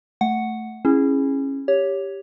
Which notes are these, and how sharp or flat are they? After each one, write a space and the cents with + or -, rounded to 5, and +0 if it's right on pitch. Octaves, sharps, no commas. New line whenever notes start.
A3 +0 F#5 +0
C#4 -20 E4 +0 G#4 +0
G4 +5 C#5 +10